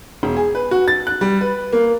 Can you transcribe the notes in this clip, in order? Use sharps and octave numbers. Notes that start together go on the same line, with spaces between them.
E1
G#4
B4
F#4
A6
F#6
G3
B4
A#3